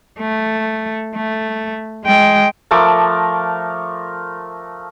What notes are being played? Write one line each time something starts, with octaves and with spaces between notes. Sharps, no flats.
A3
A3
G#3 G5
F3 A3 A#4 D6